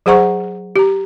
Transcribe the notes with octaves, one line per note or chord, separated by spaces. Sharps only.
F#3 G#4 C5 F#5 A#5 C#6
G4 A#5